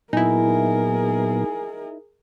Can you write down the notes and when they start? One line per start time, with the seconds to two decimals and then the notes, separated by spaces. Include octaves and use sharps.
0.13 A#2 F#3 B3 D#4 E4 G#4 A#4 G#5